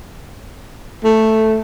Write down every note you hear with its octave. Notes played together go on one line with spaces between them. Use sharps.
A3